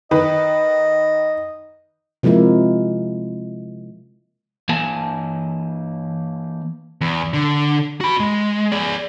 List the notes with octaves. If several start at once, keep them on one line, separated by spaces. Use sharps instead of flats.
D#3 B4 D#5
C3 F3 G#3 A#3 E4
E3 A#3 G#5 A5
E2
D3
F#4 B5
G#3
G#4 D5